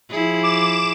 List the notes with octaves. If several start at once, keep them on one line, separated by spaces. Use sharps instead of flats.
F3 E4 G#4
D6 E7